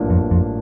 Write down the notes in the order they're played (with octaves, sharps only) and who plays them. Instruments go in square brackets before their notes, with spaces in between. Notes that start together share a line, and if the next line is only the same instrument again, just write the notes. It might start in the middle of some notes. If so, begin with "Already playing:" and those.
Already playing: [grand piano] A1 G2 F3 A#3 D4
[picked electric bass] F2
F2